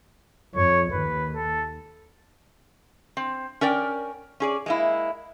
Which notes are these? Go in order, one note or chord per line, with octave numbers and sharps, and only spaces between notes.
F2 C#5
D#2 B4
A4
C4
C#4 A#4 D5 G5
C#4 G#4 D5
G#3 A#3 E4